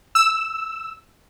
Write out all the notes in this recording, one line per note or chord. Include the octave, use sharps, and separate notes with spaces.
E6